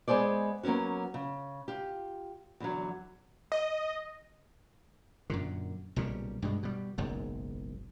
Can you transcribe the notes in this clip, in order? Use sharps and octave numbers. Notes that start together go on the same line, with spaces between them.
G#3 B3 G#4 C5 D5
F#3 A#3 B3 C#4 F#4
C#3
F4 G4
E2 D3 F#3
D#5
F#2 A#2 D3
B1 A#2 C#3 G3
G2 B2 G#3
B2 G3
F#1 B1 G#2